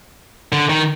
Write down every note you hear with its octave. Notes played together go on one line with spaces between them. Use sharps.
D3
D#3